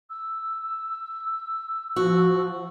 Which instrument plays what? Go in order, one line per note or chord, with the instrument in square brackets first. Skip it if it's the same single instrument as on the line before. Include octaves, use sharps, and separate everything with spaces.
[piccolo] E6
[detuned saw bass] F3 [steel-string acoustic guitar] F#4